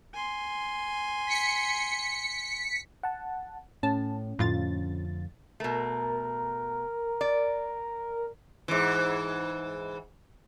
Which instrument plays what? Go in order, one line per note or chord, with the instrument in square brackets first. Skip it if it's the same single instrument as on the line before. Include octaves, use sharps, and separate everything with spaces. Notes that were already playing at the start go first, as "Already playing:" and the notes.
[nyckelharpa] G#5 C6
[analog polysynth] B6 C#7
[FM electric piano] F#5 A5
[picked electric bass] A2 [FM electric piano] C#4 [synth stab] A5
[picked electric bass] F2 D3 [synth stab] A2 F4 A6
[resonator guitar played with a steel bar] B2 A3 [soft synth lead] A#4
[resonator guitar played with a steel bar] D5
[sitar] G#2 E3